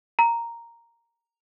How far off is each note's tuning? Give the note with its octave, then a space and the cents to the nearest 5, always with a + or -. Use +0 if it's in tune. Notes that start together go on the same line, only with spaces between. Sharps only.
A#5 -5